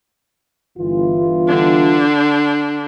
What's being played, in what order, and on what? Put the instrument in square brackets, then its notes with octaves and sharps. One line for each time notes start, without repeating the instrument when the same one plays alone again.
[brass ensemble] G1 E3 F4
[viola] D3 D4